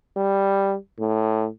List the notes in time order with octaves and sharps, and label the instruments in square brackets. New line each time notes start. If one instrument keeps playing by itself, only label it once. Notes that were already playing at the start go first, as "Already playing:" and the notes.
[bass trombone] G3
A2